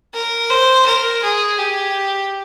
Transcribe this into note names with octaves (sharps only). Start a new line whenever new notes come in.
A#4
C5
A#4
G#4
G4